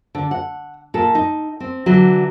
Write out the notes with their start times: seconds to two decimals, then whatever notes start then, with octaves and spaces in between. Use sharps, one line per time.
0.15 D3
0.31 F#5
0.94 A#2 A4
1.15 D#4
1.60 C4
1.86 D3 E3 F#3